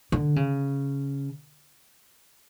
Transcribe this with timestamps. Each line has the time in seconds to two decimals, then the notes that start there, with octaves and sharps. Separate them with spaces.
0.12 D3
0.36 C#3